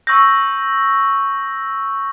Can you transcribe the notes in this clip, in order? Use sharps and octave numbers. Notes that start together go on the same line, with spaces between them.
C#6 E6 G6 A#6